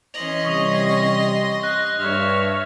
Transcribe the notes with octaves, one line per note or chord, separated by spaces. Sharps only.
E3 C#4 D#5 C6 F7 F#7
C3 G3 C#6 D#6
F#6 A#6
G2 C#5 E5 F6